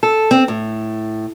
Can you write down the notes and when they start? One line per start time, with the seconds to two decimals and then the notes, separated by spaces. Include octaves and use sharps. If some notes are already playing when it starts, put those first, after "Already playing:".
0.03 A4
0.31 C4
0.48 A2